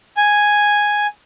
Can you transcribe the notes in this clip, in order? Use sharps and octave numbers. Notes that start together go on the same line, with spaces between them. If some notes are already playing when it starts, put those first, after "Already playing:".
G#5